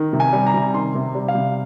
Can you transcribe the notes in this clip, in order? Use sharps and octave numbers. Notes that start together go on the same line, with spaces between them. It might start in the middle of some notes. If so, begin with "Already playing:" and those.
Already playing: D#3
C3
G#5
G3
A#5
C3
D#3 C6
C3
G3
F5
C3